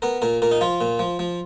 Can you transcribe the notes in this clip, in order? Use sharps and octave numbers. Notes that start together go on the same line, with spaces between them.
B3 A#4
A#2 A#4
A#2 A#4
D#4
F3 F4
A#2
F3
F3